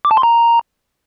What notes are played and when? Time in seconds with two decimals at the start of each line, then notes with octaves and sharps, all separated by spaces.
0.05 D6
0.11 A5
0.17 C6
0.23 A#5